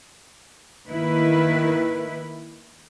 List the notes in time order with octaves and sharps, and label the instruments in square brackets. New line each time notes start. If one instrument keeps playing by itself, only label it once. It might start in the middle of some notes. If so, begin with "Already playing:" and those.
[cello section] D#3 A#3 E4 B4